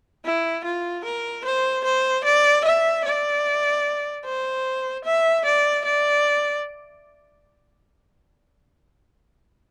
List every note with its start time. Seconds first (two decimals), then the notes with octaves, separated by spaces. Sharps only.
0.25 E4
0.64 F4
1.04 A#4
1.45 C5
1.85 C5
2.25 D5
2.65 E5
3.05 D5
4.25 C5
5.05 E5
5.45 D5
5.85 D5